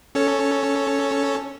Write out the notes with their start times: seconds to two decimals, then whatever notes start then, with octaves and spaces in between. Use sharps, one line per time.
0.15 C#4 A4 C#5